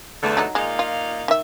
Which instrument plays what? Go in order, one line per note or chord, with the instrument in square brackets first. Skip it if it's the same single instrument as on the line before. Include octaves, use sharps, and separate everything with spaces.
[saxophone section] E2 D3 A3
[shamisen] F#3 D#4
[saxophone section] A#2 D#4 F5 [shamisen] G#3
[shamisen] F4
D#3 E5